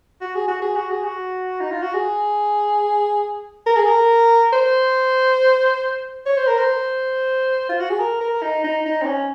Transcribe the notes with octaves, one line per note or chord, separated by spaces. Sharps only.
F#4
G#4
F#4
G#4
F#4
G#4
F#4
D#4
F4
F#4
G#4
A#4
G#4
A#4
C5
C#5
C5
A#4
C5
F4
F#4
G#4
A#4
A#4
D#4
D#4
D#4
C4
C#4